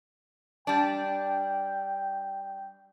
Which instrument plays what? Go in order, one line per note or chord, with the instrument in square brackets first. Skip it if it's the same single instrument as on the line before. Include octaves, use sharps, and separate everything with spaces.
[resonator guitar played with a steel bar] G3 D4 [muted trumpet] G5